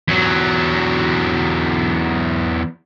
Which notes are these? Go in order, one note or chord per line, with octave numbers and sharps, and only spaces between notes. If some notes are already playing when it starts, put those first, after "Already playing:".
E2 F#3